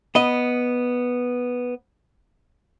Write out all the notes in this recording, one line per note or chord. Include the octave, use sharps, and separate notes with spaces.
B3 D#5